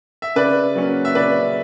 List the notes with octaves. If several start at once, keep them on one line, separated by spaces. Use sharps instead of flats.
E5
C#3 B4 D5
F#3 A#3 C#4
E5
C#3 B4 D5